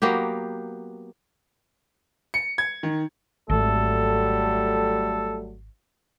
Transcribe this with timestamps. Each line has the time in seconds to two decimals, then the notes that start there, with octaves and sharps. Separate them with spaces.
0.02 F#3 A#3 B3 G4
2.34 C#7
2.58 G#6
2.83 D#3
3.49 G#1 F#3 G3 A3 A4